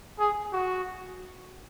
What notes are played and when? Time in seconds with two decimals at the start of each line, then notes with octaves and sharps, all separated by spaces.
0.19 G#4
0.52 F#4